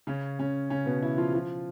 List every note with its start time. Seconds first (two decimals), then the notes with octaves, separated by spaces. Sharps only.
0.07 C#3 C#4
0.39 C#3 C#4
0.70 C#3 C#4
0.86 B2 B3
1.02 E3 E4
1.18 F3 F4
1.33 F3 F4